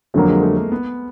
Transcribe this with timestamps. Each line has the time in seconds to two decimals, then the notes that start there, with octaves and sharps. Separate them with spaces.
0.14 F2 D3 F#3 A#3 C4
0.28 G#3
0.42 A3
0.57 A#3
0.72 B3